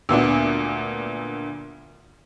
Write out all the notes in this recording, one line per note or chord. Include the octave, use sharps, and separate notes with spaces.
D2 A#2 B3 D4